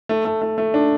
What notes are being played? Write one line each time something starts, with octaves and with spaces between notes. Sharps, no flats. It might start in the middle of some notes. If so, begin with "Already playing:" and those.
A3
A3
A3
A3
D4